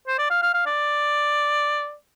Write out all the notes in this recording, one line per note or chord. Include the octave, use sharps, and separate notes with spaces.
C5
D5
F5
F5
F5
D5